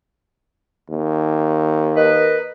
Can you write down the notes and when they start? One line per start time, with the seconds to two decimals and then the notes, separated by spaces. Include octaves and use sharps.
0.89 D#2
1.96 A#4 B4 D#5